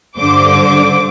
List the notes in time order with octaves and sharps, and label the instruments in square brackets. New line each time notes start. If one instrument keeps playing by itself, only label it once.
[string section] G2 D3 C5 D6